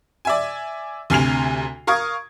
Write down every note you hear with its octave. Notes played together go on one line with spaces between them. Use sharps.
D5 E5 G#5
D2 C3 G#5 F6 C7 F7
A#4 F5 C#6 D#6 G#6